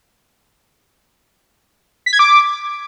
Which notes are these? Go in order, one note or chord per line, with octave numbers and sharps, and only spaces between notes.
B6
G#6
D6